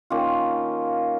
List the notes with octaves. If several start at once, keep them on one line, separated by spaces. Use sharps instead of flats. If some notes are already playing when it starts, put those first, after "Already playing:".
D#3 A#3 C#4 F4